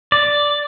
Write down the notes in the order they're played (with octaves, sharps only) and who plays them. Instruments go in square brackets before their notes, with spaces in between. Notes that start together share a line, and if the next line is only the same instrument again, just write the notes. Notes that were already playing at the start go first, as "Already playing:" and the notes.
[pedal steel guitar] D5